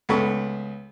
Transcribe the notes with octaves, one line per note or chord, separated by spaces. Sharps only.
C#2 A3 B3 B5 C#6